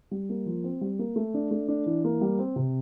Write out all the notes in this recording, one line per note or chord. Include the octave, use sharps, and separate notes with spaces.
G3
A#3
F3
C4
G3
A#3
A3
D4
A3
D4
E3
A#3
G3
C4
C3